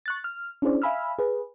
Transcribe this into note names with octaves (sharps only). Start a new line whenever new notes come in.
C#6 F#6 A6
F6
C#4 D4 E4 G#4 C5 D5
E5 F5 G#5 B5 E6 F6
G#4 B4